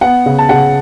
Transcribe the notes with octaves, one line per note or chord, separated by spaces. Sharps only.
B3 F#5
C#3
A5
C#3 F#5